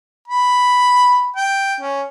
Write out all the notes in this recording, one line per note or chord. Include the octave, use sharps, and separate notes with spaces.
B5
G5
C#4